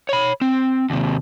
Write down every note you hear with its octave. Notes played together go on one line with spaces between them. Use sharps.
C#5 B5
C4
D#2 C3